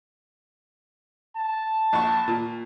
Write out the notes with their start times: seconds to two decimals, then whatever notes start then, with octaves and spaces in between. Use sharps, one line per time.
1.36 A5
1.93 A#1 F#5 C#6
2.28 A#2